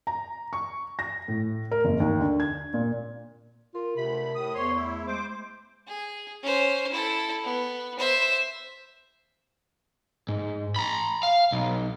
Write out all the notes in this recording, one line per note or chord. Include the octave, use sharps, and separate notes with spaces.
A#5
C#6
A#6
A2
A#4
F#1
D#2
D3
G#6
A#2
F4 A#4
D2 C3 B5
A2 D#6
E2 C5 C#5 C6 C#6
A3 E4
G#3 C5 D6
G#4
C#4 C5
E4 A4
B3
C5 E5
G#2
A#5 B5
F5
B1